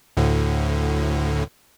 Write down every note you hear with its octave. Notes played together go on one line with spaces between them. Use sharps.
D2 A2 D3